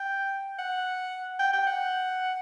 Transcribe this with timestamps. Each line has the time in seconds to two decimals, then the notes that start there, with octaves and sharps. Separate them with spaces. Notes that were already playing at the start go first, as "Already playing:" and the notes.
Already playing: G5
0.59 F#5
1.39 G5
1.53 G5
1.66 F#5